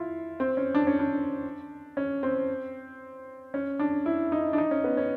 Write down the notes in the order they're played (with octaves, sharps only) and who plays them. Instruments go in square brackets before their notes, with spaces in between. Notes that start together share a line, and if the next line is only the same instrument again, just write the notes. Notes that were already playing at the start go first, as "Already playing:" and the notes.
Already playing: [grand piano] E4 F4
C4
C#4
D4
C#4
D4
C#4
C4
C#4
D4
E4
D#4
D4
D#4
C#4
B3
C#4